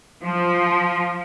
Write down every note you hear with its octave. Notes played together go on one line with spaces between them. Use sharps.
F3